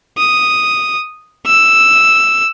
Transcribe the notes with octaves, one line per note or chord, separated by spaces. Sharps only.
D#6
E6